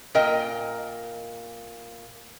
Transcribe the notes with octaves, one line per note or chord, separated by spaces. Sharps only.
A#2 A#4 D#5 G5